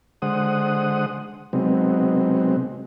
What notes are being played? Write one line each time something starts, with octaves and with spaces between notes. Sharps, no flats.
D3 G#3 C5 F#5 D#6
C3 F#3 G#3 B3 C4 D#4